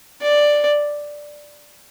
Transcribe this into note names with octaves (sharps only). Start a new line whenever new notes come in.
D5